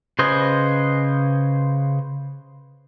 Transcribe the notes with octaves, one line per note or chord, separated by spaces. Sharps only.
C#3 B4 C5 D#5 G#5